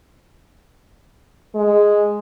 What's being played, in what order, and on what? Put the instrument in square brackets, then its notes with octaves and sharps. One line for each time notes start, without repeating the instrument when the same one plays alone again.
[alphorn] G#3